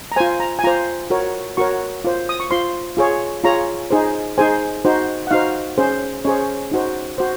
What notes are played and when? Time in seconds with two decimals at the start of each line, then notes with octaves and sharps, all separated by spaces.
0.12 A#5
0.16 F4 C5 G#5
0.40 A#5
0.59 G#5
0.64 F4 C5 A#5
1.10 F#4 A#4 C#5
1.57 F#4 A#4 C#5 C#6
2.04 F4 C5
2.29 D#6
2.40 C#6
2.51 F4 C5 C6
2.97 F4 G#4 C#5
3.44 F4 G#4 C#5 A#5
3.91 D#4 G#4 C5
4.38 D#4 G#4 C5 G#5
4.85 D#4 F#4 C5
5.27 F#5
5.31 D#4 F#4 C5 F5
5.78 C#4 G#4 C5
6.25 C#4 G#4 C5 C#5
6.72 D#4 F#4 C5
7.18 F#4 C5